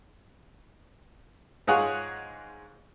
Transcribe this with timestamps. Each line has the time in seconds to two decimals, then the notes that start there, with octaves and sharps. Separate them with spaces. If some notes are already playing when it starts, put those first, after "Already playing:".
1.67 G#2 G#3 F4 G#4 C#5 F#5